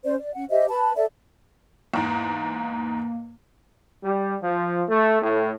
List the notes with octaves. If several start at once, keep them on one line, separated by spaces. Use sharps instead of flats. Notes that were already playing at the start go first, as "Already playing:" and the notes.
C#4 C5 D5
D5
C#4 F#5
G4 C5 D#5 E5
B4 A5 B5
A4 D5 E5
E2 G#2 A#3
G3
F3
A3
A2